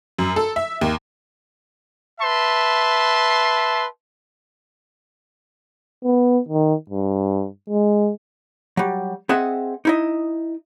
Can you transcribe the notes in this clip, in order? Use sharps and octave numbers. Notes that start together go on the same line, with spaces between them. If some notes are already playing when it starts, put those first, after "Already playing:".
F#2
A4
E5
D#2
B4 E5 A5 C6
B3
D#3
G2
G#3
F#3 G3
C4 G#4 D#5 E5 F#5
D#4 E4 D#5